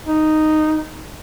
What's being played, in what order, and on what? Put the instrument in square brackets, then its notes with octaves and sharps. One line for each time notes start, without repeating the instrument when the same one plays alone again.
[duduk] D#4